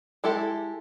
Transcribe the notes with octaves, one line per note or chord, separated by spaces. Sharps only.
G#3 E4 G4 A4